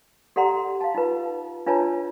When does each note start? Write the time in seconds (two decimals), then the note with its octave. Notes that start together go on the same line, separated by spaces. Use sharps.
0.36 G4 A4 D5 F#5 A#5 C6
0.81 F5 A5
0.95 D#4 F4 B4
1.66 D4 F4 B4 C#5 A5 A#5